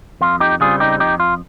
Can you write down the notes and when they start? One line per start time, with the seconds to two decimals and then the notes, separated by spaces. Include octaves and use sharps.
0.21 F2 F4
0.40 D#4 G4
0.60 C#3 G3 C4 F4 G#4
0.80 D#4 G4
1.00 F2 D#4 G4
1.20 F4